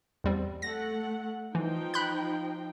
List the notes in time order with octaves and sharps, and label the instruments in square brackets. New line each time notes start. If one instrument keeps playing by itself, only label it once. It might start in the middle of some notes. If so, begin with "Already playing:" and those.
[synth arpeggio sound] E2 G3 C4
[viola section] A3 F#5 [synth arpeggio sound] A#6
[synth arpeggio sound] E3 [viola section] F3 D#4 G5
[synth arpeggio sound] B5 F#6 G6